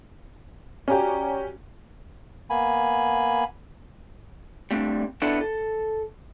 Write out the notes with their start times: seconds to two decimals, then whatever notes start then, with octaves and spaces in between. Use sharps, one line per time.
0.88 C#4 F#4 G4 D5 G#5 A#5
2.50 A#3 B3 G#5 B5
4.71 G3 A3 C4 D4
5.22 B3 D4 E4 A4
5.41 A4